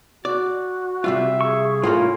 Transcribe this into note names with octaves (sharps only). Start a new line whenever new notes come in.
F#4 D5
C3 G3 F4 E5
G#4 C#6
A2 A3 A#3 C#4 F4